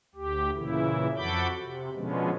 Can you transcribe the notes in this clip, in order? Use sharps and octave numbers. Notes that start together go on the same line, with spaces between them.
D2 G4
A#2 C#3 E3 E4
F2 F#4 A4 B5 D6 G6
C3
B2 D3 F3 G#3 B3 C#4